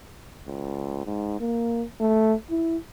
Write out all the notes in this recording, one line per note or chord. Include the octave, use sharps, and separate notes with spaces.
C#2
G#2
A#3
A3
E4